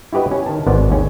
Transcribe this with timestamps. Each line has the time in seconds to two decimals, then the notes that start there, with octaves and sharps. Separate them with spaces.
0.13 E4 F#4 G4 B4 D#5
0.31 C#4
0.46 D#3 A5
0.66 G#1 G#3 B3 C5 D5
0.90 D#2 C#4